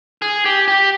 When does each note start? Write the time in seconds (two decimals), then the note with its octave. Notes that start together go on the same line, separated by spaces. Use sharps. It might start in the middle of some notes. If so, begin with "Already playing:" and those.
0.22 G#4
0.45 G4
0.68 G4